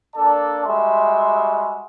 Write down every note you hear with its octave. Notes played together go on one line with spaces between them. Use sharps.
A#3 D4 A4 D5 A5
G3 G#3 F#4 E5 C6